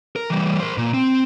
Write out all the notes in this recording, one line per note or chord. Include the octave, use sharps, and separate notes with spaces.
A#4
E3 G3
A#4 C5
A#2
C4